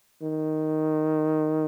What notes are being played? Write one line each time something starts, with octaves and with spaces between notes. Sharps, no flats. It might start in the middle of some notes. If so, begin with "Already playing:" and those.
D#3